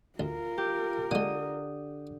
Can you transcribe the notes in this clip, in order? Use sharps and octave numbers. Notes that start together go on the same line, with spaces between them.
D2 F4 A#4
G4
D3 G#3 A#3 D#6